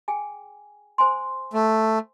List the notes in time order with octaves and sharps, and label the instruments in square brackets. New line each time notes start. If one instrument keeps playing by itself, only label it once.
[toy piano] G#4 G5 G#5
C5 G#5 C6
[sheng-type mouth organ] A3